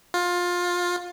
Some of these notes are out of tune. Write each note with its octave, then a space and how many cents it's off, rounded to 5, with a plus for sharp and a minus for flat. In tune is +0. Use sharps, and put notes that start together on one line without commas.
F4 +20